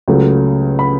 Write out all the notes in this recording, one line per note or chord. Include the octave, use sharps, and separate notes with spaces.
C#2 C#3 F#3 A3
B5